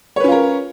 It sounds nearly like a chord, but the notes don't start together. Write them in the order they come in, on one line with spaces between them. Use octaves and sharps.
C#5 B4 C#4 F4 A#4